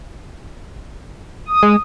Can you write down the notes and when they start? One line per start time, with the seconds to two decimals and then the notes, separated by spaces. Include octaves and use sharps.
1.46 D#6
1.63 G#3